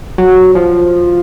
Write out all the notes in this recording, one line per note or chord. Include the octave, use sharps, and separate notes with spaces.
F#3
F3